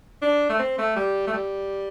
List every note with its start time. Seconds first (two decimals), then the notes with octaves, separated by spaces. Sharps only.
0.22 D4
0.49 A3
0.59 C4
0.78 A3
0.96 G3
1.27 A3
1.33 G3